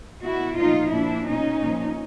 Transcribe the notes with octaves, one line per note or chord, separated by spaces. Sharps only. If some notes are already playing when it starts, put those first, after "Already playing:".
B2 E4 F#4
A#2 F3 D#4 F4
A#2 F3 D4 E4
B2 C#4 D#4
A#2 F3